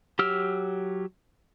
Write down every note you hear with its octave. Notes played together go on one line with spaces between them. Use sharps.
F#3 G4 E6 F6